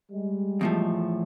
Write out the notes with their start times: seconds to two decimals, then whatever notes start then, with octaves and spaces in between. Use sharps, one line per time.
0.12 G3 G#3
0.61 E2 A2 F3